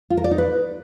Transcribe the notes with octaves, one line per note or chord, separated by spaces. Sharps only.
F4
A#4
D5
D#4
B4